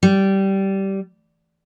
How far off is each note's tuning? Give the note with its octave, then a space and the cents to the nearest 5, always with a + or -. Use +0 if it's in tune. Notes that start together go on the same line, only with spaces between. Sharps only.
G3 -15